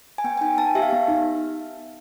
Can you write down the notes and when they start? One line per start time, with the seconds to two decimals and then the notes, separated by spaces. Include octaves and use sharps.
0.18 G#5
0.24 B3 G5
0.37 G#5
0.41 D#4 G5
0.58 B3 A5
0.75 G4 E5
0.82 F5
0.91 B3 E5
1.08 D#4